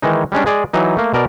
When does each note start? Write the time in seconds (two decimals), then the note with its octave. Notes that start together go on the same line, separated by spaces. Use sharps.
0.02 D#3 E3 G#3 D#4
0.32 G3 G#3 C#4 D4
0.46 G#3 G#4 D5
0.73 E3 F#3 D#4
0.97 A3 A#3
1.14 B2 A#4 D5